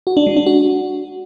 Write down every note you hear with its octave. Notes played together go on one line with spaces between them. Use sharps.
F#4
D4
G#3
D4
F#4